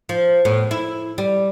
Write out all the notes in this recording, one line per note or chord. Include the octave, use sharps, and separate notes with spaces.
F3
A2 B3
E4
G3